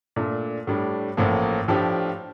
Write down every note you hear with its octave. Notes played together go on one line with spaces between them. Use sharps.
A#2 A3 D4
A2 G3 D4
A1 A2 F3 A#3
A2 F3 A3 D4 G4